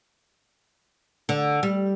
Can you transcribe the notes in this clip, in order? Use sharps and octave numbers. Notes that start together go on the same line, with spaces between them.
D3
G3